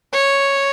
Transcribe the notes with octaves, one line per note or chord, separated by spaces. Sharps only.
C#5